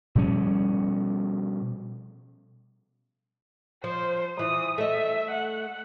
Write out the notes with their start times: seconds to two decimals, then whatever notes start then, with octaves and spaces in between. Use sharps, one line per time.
0.15 B2 F3 G3 C#4
3.84 F3 C5
4.39 E3 F3 D#6
4.78 A3 D#5 E5
5.31 F#5